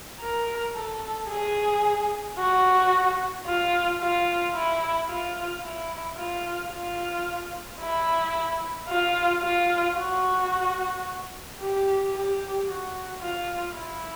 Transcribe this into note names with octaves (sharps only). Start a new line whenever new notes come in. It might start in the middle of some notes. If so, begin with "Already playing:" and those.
A#4
A4
G#4
F#4
F4
F4
E4
F4
E4
F4
F4
E4
F4
F4
F#4
G4
G4
F#4
F4
E4